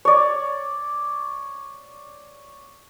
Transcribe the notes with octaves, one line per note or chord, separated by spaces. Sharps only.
C#5 D5